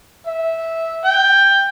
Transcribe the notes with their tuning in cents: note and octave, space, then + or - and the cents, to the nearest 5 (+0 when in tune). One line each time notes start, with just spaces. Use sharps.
E5 -10
G5 +10